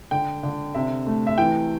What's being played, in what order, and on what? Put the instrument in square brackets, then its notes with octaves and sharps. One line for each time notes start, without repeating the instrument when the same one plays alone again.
[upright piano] D3 G5
D3
C3 E5
A3
E5
E3 G5